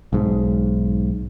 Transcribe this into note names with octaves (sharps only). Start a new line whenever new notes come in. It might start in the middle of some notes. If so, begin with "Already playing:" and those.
B1 G#2